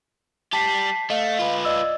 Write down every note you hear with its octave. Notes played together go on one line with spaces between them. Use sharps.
G3 G4 A5 B6 C7
A3 D#5 F5
F4 B4
D5 D#5 E6